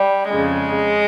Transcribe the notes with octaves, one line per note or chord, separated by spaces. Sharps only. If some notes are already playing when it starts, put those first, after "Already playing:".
Already playing: G3
F2 C#3 G#3